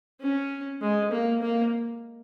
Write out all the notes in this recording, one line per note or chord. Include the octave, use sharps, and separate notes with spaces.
C#4
G#3
A#3
A#3